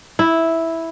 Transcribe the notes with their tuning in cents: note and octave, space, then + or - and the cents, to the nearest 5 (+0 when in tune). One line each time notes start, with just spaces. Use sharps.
E4 -5